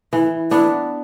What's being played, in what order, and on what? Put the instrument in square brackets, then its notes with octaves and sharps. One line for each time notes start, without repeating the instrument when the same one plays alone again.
[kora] E3 [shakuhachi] E4
[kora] B3 D4 [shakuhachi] E4